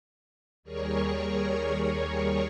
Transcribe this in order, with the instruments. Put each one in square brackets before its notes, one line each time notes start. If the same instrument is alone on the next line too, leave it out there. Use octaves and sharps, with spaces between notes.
[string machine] D#2 G3 G#4 A#4 C#5 C#6